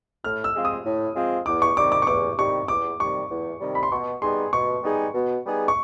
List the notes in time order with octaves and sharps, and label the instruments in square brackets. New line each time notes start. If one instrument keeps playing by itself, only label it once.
[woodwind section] A2 [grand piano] F6
[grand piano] E6
[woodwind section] F3 G#3 C4 F4
[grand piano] D#6
[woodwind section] A2
F3 G#3 C4 F4
[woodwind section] E2 [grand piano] D6
[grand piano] C#6
[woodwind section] C3 D#3 G3 [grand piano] D6
[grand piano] D6
C#6
[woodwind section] E2 [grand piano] D6
[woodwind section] C3 D#3 G3 [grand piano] C#6
[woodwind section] E2 [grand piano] D6
[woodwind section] C3 D#3 G3 [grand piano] C#6
[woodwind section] E2
C3 D#3 G3
[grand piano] B5
C6
[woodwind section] B2 [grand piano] C#6
[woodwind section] G3 B3 D#4 G#4 [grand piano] C6
[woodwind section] B2 [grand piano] C#6
[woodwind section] G3 B3 D#4 G#4
B2
G3 B3 D#4 G#4
[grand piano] C#6